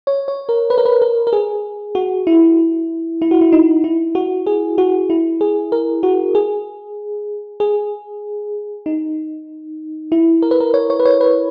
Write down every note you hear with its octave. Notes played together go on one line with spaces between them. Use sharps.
C#5
C#5
A#4
B4
A#4
B4
A#4
A#4
G#4
F#4
E4
E4
F#4
E4
D#4
E4
F#4
G#4
F#4
E4
G#4
A#4
F#4
G#4
G#4
D#4
E4
A#4
B4
A#4
C#5
C#5
B4
C#5
B4